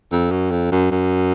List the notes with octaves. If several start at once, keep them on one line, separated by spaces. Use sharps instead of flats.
F2
F#2
F2
F#2
F#2